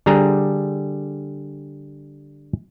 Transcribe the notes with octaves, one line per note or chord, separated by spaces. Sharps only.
D3 G3 G#4 A#5